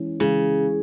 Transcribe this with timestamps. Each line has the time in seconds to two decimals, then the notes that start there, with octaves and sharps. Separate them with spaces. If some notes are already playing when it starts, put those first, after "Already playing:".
Already playing: E3 G#3 C#4
0.20 C#3 E3 G#3 C#4